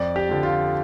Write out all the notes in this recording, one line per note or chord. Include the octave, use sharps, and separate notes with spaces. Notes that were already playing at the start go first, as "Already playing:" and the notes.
Already playing: F2 D5
G4
D3 F3
F4